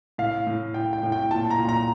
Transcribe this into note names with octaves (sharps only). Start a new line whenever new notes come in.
A2 F5
A2
A2 G5
G5
A2
G5
A#2 A5
A#5
A#2
A#5